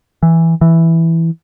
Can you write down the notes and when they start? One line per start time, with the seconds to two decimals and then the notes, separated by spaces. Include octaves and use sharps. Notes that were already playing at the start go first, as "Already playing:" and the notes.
0.23 E3
0.61 E3